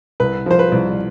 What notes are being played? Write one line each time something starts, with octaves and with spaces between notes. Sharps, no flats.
C2 B4
F3 C5
B4
C2